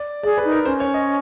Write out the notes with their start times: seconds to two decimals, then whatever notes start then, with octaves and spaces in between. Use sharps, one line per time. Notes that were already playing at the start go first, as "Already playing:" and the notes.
Already playing: D5
0.23 G#4 D5
0.38 B4
0.45 D#4
0.52 A#4
0.65 C#4 C5
0.80 C#5
0.94 D#5